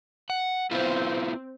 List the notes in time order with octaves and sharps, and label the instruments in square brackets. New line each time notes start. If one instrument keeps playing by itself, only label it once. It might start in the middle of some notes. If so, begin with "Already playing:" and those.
[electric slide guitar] F#5
[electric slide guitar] B3 E4 F4 [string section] C4